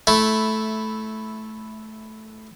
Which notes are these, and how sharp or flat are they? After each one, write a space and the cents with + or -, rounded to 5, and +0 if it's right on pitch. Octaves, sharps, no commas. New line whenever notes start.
A3 -10 E4 +0